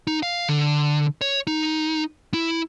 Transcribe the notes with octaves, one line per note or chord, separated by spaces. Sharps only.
D#4
F5
D3
C#5
D#4
E4